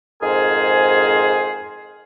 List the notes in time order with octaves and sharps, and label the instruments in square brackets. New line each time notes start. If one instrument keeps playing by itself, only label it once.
[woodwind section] F2 G#2 G#4 A#4 C5 G#5